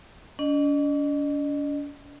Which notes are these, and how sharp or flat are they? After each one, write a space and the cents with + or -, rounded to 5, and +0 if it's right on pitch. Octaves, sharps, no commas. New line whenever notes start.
D4 -45 D#5 -35